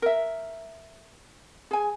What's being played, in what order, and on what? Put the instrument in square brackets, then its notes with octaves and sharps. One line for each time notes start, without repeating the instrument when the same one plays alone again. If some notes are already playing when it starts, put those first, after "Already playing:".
[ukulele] A#4 E5
G#4 G#5